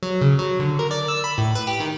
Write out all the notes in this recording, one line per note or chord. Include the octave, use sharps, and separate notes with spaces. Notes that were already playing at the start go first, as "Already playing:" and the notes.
F#3
C#3
F#3
D3
A#4
D5
E6
B5
A2
B4
G4
D#3